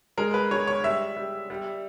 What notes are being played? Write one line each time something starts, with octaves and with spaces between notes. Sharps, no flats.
G#3 A#4
B4
G#3 C#5
C#5
G3 E5
G3
G3